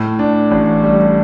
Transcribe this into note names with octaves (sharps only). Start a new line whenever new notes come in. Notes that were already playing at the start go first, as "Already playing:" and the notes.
Already playing: A2
D4
A1
G3